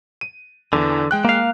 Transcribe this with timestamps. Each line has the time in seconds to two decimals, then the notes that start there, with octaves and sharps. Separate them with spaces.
0.21 D#7
0.73 E2 D3 E3
1.11 G#3 G5 F#6
1.25 A#3 F5